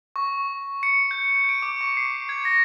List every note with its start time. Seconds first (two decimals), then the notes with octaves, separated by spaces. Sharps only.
0.16 C#6
0.83 C#7
1.11 G6
1.49 D7
1.62 D6
1.81 C#6
1.97 C7
2.29 G#6
2.45 A#6